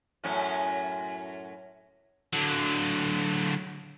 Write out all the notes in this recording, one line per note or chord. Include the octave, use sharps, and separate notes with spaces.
F#2 A2 C#4
D3 F#3